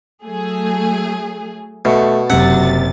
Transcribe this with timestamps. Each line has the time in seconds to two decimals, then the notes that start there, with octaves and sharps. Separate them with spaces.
0.25 F#3 A3 G#4
1.85 B2 A3
2.30 F#1 C3 F#3 F#5 A6